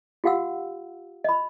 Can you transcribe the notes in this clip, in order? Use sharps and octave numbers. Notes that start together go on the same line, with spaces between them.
F4 G4 F5 F#5 E6
D#5 B5